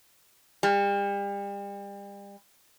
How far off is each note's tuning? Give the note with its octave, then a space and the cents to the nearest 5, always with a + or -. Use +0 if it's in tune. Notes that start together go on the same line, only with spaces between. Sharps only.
G3 +35